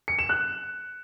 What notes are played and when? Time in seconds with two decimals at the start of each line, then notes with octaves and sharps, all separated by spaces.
0.08 C#7
0.19 E7
0.29 F#6